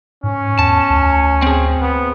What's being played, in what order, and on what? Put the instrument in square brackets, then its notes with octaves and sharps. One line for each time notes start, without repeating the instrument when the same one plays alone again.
[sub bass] G#2 [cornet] C#4
[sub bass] E2 [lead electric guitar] A5
[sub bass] D2
[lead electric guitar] C4 G#4
[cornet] B3